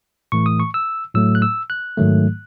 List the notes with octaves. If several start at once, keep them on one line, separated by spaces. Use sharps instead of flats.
A2 E3 A3 C#6
D#6
C#6
E6
A2 F#3 A3 E6
F#6
E6
F#6
G#2 D#3 F#3 A3